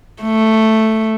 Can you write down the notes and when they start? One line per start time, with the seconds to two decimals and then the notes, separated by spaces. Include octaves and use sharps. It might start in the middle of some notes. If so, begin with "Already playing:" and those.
0.23 A3